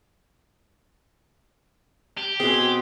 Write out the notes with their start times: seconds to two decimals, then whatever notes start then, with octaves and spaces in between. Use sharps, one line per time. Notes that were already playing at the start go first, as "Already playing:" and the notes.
2.18 G4
2.40 B2 C4 G#4